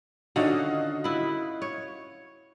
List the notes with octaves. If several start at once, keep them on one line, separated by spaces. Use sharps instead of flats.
D3 D#3 C#4 F4 F#4 D#5
E4 B4
C#5